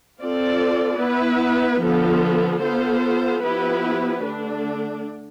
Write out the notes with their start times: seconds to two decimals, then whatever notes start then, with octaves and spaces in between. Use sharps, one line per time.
0.20 C4 F4 A4 D5
1.00 B3 E4 B4
1.81 D3 F3 B3 F4 A4
2.62 B3 F4 A4 C5
3.41 F3 B3 E4 G4 B4
4.22 D3 A3 D4